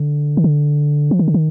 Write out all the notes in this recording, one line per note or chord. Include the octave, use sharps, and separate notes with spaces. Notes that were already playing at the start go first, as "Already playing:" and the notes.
Already playing: D3
D#3
D3
F3
D#3
D3
D#3